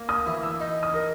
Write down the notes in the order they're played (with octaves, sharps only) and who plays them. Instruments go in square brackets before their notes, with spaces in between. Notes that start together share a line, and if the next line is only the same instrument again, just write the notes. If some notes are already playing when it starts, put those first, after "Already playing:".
Already playing: [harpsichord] A#3
[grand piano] D#6
[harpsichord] E3
[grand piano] E6
[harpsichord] D#4
[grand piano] D#6
[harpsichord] A#4